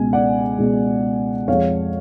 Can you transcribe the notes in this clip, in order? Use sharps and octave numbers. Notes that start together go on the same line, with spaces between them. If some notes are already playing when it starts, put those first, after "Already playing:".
Already playing: C#2 B2 G#3 G#5
D5 F#5
C#2 B2 G#3
F2 F3 G#3 C#5 F5